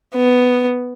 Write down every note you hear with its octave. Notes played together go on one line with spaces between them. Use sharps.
B3